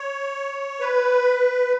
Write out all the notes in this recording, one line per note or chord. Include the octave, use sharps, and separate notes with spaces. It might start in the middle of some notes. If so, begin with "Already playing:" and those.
Already playing: C#5
B4